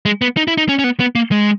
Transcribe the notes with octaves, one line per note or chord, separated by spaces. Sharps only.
G#3
B3
D#4
E4
D#4
C#4
C#4
B3
B3
A#3
G#3